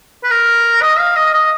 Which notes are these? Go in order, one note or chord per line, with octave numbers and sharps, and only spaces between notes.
B4
A#4
D#5
F5
D#5
D#5